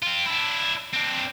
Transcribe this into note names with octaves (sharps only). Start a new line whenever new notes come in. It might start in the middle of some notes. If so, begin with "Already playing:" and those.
C4 F4
D4 E4
C4 D4